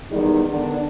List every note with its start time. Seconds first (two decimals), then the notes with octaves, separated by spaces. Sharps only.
0.11 E2 D#3 G3 G#3 D#4
0.49 D3 D#3 B3 D4